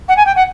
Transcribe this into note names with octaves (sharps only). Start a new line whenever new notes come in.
F#5
G#5
G5
F#5